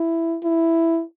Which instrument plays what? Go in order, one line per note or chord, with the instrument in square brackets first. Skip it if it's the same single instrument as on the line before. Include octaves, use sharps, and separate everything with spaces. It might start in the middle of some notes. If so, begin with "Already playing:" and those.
Already playing: [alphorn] E4
E4